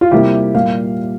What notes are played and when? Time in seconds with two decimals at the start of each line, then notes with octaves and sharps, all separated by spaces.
0.01 F4
0.11 C3 G3 A#3 E4 G4
0.54 A#2 G3 A#3 F5